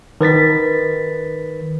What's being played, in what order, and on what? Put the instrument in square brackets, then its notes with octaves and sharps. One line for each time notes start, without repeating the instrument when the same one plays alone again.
[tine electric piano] D#3 B4 A6 B6